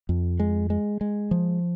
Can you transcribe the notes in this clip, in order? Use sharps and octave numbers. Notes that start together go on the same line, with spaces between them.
F2
G#3
G#3
G#3
F3